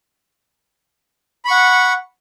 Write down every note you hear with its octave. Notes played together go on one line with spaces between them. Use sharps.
F#5 B5 C#6